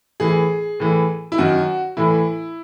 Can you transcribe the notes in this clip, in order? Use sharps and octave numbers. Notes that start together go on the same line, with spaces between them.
A2 E3 G#4
A2 E3
E4
F#2 D#3 F#4
A2 E3 E4